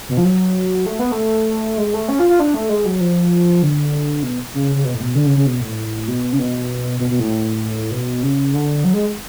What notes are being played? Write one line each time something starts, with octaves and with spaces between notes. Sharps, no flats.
B2
F3
F#3
A3
B3
A3
G#3
A3
C#4
F4
F4
D4
A3
G#3
F#3
F3
D3
B2
C#3
C#3
B2
A2
B2
D3
C#3
C#3
B2
A2
B2
C#3
B2
B2
B2
A2
B2
C#3
D3
F#3
G#3